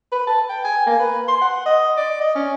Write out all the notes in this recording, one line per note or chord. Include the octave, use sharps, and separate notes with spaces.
B4
A5
G5
G#5
A#3
B4
C6
F#5
D#5
D5
D#5
C#4